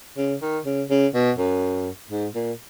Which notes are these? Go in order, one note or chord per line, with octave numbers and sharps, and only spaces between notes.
C#3
D#3
C#3
C#3
B2
F#2
G#2
A#2